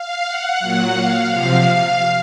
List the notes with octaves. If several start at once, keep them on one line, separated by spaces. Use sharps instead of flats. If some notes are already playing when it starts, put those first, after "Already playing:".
Already playing: F5
F#5
A#2 F#3 F#5
F5
C3 F3 F5